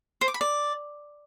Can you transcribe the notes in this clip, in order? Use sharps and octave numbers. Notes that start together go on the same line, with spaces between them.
C5
D6
B5
D5